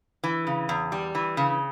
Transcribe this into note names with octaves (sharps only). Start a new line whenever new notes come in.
E3
C#3
E2
G3
E3
C#3